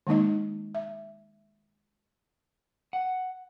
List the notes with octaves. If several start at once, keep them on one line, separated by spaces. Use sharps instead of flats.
D#3 G#3 A#3 D#4 D#5
E5
F#5